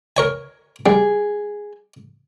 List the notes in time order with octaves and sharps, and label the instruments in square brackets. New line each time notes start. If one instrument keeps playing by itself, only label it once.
[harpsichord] A#4 C#5 G#5
[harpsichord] G3 [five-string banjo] G#4